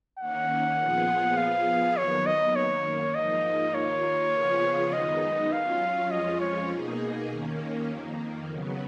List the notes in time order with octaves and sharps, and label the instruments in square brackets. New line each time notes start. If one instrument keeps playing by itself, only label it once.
[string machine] D#3 A#3 C#4 [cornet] F#5
[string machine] A#2 F3 B3 F4 G#4
[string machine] F3 B3 F4 G#4 [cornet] F5
[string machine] D#2 D#3 F#3 B3 [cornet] C#5
[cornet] D#5
[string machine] F#2 D#3 A#3 [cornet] C#5
[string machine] G#2 F3 A#3 D#4 [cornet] D#5
[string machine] D#2 D#3 A#3 F4 [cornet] C#5
[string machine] C#3 F3 B3 F4 G#4
[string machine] F#2 D#3 G#3 B3 D#4 [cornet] D#5
[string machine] F#3 C#4 F4 [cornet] F5
[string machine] F2 F3 G#3 C#4 F4 [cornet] D#5
[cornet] C#5
[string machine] B2 A#3 D#4 G#4
D#2 D#3 A#3 C#4
F2 D#3 A#3
C#3 F#3 B3